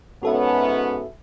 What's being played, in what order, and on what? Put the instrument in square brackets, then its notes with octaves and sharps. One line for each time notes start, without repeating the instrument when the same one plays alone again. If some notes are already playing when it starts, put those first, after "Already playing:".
[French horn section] G#2 B3 C#4 [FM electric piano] F#4 A4 E5